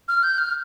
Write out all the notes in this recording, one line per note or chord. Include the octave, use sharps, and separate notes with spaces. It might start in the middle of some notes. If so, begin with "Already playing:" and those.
F6
G6
F6